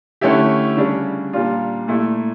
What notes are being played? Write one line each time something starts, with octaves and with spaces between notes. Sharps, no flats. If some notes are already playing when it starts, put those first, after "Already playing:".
D3 A3 C#4 E4 G4
C#3 G3 D4
A#2 G3 D4 F4
A#2 A3 E4